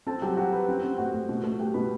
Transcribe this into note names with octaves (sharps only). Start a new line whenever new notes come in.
C4 A4 A5
F#3 G4 G5
F#4 G4 G5
B4
C4
C4
A2 F#4 F#5
A2
B2
A3
A3 G4 G5
B2 B4 B5